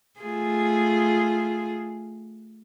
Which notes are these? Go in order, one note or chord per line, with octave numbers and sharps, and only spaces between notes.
A3 F4 G#4